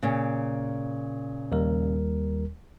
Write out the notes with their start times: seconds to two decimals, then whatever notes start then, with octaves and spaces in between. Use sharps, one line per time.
0.03 A#2 C#3
1.52 D#2 G3 A#4